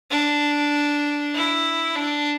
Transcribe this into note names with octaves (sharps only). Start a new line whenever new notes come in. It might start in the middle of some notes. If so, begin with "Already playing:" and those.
D4
E4
D4